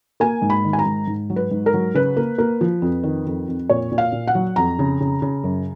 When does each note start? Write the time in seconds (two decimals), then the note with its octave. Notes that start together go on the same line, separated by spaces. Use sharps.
0.20 A#3 G#5
0.42 G#2
0.50 B5
0.64 D#3
0.73 G#5
0.79 A#5
0.86 G#2
1.07 G#2
1.30 F#3
1.36 B4
1.51 G#2
1.66 A#4
1.74 F#3
1.94 C#3 B4
2.17 A#3
2.38 A#3
2.61 F3
2.82 F2
3.03 D#3
3.26 F2
3.48 F2
3.70 A#2 C#5
3.92 A#2
3.98 F5
4.12 A#2
4.27 F#5
4.35 F#3
4.56 F2 A#5
4.79 C#3
5.01 C#3
5.22 C#3
5.44 F#2